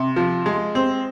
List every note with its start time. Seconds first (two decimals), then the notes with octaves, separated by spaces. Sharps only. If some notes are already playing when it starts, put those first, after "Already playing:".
Already playing: C3
0.16 F3
0.46 G#3
0.75 C4